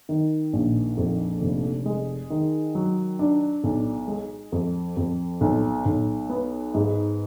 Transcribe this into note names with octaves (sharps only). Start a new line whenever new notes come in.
D#3
A#1
F2
F1
G#3
D#3
F#3
D4
B1
G#3
F2
F2
B1
B1
B3
G#2